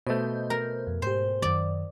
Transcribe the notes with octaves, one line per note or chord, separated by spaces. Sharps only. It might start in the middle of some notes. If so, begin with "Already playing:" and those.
B2 A3 C5 D#5 G6
A#4
F2
G#2 G4 C5
F#2 D#3 D5